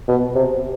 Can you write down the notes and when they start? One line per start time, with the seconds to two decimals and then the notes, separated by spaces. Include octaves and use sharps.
0.08 B2
0.35 C3